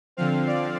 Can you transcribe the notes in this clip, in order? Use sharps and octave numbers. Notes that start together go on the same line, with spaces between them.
D3 F3 C4 F5
D5